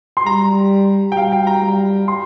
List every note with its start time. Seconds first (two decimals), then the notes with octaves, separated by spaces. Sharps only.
0.17 C6
0.26 G3 A#5
1.12 G5
1.16 G3 F5
1.32 G5
1.47 A#5
1.62 G3
2.08 C6